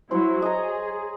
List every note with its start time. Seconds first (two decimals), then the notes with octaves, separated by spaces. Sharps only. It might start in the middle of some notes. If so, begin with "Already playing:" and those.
0.11 F#3 E4 C5 C#5
0.42 G#4 D#5 A#5